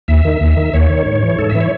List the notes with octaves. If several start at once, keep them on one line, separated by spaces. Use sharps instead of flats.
D#2 E5
D#3
D#2
D#3
D#2 C#5
D#3
G#2
E3
G#2 A4
E5
E3 C#5